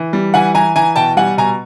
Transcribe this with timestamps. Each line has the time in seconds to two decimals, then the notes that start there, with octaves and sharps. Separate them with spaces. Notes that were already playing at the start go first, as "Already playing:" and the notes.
Already playing: E3
0.13 G3
0.34 E3 F#5 G#5
0.54 E3 G#5 A#5
0.76 E3 G#5 A#5
0.96 B2 G5 A5
1.17 G3 F#5 G#5
1.37 B2 G#5 A#5